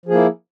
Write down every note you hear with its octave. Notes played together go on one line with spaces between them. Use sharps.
F3 A#3 E4 G#4